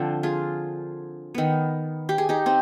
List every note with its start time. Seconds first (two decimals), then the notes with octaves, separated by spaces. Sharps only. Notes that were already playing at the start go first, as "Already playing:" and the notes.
Already playing: D3 F3 C4
0.23 F4 G#4
1.35 D#3 B3
2.09 G4
2.18 G#4
2.29 D#4 G4
2.46 C4 D#4